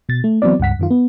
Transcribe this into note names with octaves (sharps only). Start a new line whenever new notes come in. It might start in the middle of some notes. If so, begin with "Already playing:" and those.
B2 A6
A3
E3 F#3 B3 C4 D5
C#2 G2 F#5 B6
F#2 D#3 F4
B3